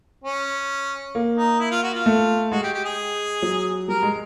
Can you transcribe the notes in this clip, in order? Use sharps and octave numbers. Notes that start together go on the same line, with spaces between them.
C#4
A#3
D#4
E4
F4
F#4
F4
A3
G#3 F#4
G4
G4
G#4
F#3
G3 A#4
G#3